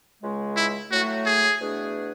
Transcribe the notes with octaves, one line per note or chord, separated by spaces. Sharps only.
C#2 C#3 G#3
E4
A2 F#3 A3 F#4
G#4
E2 B2 A3 D4 G#4